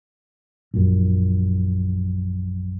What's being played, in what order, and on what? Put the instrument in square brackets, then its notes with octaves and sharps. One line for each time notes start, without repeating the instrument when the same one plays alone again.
[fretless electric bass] A#1 F#2